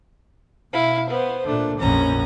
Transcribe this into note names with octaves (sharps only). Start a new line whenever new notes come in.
B2 E4 F5
B3 C5
A#2 A3 D4
A#1 F2 C#4 A#5